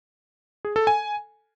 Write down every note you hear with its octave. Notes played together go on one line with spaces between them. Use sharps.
G#4
A4
G#5